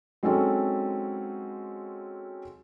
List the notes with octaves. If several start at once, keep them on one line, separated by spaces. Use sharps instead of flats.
F#3 G#3 C4 C#4 D#4 A4